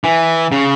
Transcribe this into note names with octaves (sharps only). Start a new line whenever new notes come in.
E3
C#3